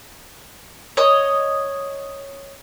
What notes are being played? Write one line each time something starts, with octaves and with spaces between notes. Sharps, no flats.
C#5 D#5 D#6